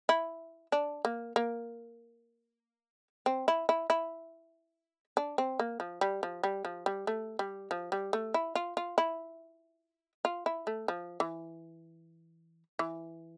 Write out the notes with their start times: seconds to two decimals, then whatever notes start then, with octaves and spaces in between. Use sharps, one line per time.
0.09 E4
0.72 D4
1.05 A#3
1.36 A#3
3.26 C4
3.48 E4
3.69 E4
3.90 E4
5.17 D4
5.38 C4
5.59 A#3
5.80 F3
6.01 G3
6.23 F3
6.43 G3
6.65 F3
6.86 G3
7.07 A3
7.39 G3
7.71 F3
7.92 G3
8.13 A3
8.34 E4
8.55 F4
8.77 F4
8.98 E4
10.25 F4
10.46 E4
10.67 A3
10.88 F3
11.20 E3
12.79 E3